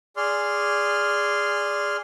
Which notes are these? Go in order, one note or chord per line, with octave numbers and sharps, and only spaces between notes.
G#4 D5 C6 F6